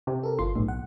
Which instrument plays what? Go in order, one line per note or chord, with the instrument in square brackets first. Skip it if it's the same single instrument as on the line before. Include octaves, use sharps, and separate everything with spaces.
[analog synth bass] C3
[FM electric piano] A4 A#4
G1 F4 C6
[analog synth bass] B1 [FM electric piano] A2
[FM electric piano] F#5